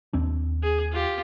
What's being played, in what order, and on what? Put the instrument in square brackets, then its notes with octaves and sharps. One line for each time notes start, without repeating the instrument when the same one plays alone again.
[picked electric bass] D#2 C4 D4
[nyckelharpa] G#4
F4 G4